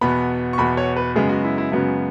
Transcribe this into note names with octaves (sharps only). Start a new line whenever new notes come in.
E2 B2 B3 B5
C#6
E2 B2 B3 B5
C#5
B4
F#2 C#3 G#3 B3 G#4
F#4
E4
E4
F#2 C#3 G#3 B3 F#4